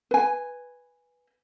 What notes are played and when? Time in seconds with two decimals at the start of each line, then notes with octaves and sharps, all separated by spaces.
0.11 B4 G#5